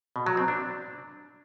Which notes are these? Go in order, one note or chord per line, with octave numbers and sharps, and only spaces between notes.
B2
F#3
C4
D4